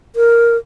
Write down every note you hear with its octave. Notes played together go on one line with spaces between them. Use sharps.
A#4